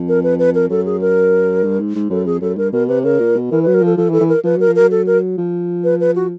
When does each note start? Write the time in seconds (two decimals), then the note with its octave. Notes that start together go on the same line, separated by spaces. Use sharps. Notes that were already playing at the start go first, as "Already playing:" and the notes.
Already playing: F2
0.08 A#4
0.24 B4
0.39 B4
0.55 A#4
0.70 F#2 A4
0.86 G#4
1.01 A#4
1.64 G2
1.80 G#2
1.95 G#2
2.10 F#2 A4
2.26 F2 G#4
2.41 F#2 A4
2.57 G2 A#4
2.73 B2 A#4
2.88 C3 B4
3.04 C#3 A#4
3.20 A#2
3.36 B2
3.51 E3 A#4
3.63 B4
3.67 F#3
3.74 A#4
3.82 F3 A4
3.97 F3 A4
4.09 E3
4.13 A4
4.21 E3
4.29 A#4
4.44 F3 B4
4.57 F#3 A#4
4.68 F3
4.75 F#3 A#4
4.91 A4
5.07 A#4
5.38 F3
5.84 B4
6.00 B4
6.16 F#4